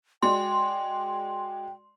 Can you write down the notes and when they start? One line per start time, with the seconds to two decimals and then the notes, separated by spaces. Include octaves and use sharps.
0.23 G#3 F#4 D5 G5 C6